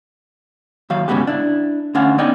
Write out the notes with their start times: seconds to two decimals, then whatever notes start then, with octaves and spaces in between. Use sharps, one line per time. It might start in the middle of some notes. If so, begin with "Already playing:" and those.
0.90 D#2 F#3 F5
1.08 G#2 C#3 G#3 B3 F#4 G4
1.27 D4 E4
1.94 D2 D3 C#4 F5 F#5
2.18 B3 C#4 D#4 D5 D#5 G5